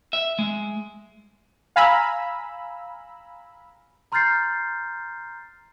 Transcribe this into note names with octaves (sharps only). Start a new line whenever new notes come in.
E5
G#3
F5 G#5 A#5 B5 E6
A#5 C6 F6 G6 A6 C7